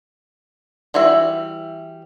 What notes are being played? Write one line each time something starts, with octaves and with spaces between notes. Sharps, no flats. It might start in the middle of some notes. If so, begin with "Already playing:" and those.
E3 G3 F#4 E5